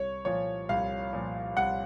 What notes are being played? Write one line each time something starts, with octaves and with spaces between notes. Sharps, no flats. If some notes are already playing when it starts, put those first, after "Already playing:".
Already playing: C2 C#5
A#2 F3 C#5
C2 F5
A#2 F3
C2 F#5